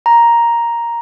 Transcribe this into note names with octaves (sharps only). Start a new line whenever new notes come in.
A#5